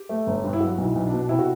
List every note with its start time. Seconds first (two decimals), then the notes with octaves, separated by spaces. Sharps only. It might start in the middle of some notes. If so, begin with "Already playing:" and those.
Already playing: G4
0.09 A3
0.27 G1
0.44 G2
0.53 E4
0.60 F#3 F#4
0.78 B1
0.84 E4
0.95 B1
1.07 D4
1.12 B2
1.29 C3 E4
1.39 F#4